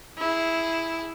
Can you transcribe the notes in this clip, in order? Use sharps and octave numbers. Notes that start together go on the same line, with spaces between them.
E4 G#4